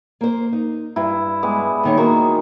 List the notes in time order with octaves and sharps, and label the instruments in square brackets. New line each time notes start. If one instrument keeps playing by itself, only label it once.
[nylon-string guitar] A#3 C5
D#4
[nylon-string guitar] G2 [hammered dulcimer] E4
[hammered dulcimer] G3 G#3 B3
[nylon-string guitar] D#2 D#3 C#5
[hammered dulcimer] D#3 [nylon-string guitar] A#3 F#4